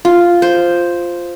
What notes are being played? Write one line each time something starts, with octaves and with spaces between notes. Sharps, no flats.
F4
C5